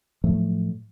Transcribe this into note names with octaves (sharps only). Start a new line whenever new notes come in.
A2 F3 F#3 A3